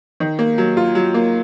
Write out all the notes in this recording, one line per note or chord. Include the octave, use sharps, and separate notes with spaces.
D#3
A#3
F#3
F4
F#3
A#3